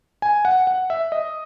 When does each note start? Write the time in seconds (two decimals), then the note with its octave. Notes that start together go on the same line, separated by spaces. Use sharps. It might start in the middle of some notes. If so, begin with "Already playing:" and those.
0.22 G#5
0.45 F#5
0.67 F#5
0.90 E5
1.12 D#5